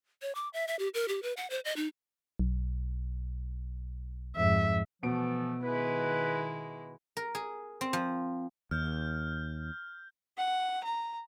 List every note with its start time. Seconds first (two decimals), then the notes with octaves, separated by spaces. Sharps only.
0.22 C#5
0.35 D6
0.53 E5
0.68 E5
0.79 G4
0.94 A#4
1.08 G4
1.23 B4
1.37 F#5
1.50 C5
1.65 D#5
1.76 D#4
2.39 B1
4.36 F2 G#2 E5
5.03 B2 E3 F3 A3 B3 D7
5.63 D#3 G#3 E4 B4
7.17 A#4
7.35 G#4
7.81 C4
7.93 F3
8.71 D#2 F6 G6
10.37 F#5
10.84 A#5